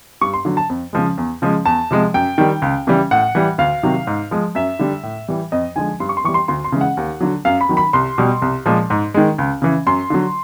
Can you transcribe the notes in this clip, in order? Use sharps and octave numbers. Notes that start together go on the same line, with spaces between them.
G2 C#6
C6
D3 F#3
A5
F2
C#3 F3 G#3
E2
C#3 F3 G#3
E2 A5
C3 F3 G#3
F#2 G5
D#3 G3
C#2
C#3 E3 G3
A2 F#5
E3 G3
D2 F5
C3 D#3 F#3
G#2
F3 G#3
F#2 E5
D3 G3
A2
E3 G3
F2 D#5
D3 F3 G#3 G#5
G2 C6
C#6
C6
E3 G3 C#6
C6
D2 C6
C6
C#3 E3 G#3
F#5
D#2
D3 F#3
F#2 F5
B5
D#3 F#3
B5
C2 C6
B2 G3
C2
A#2 F3 G#3
G#2
D#3 G#3
C#2
C#3 E3
F#2 C6
D3 F#3